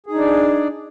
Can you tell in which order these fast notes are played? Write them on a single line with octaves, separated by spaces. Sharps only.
G#4 D#4 D4 D5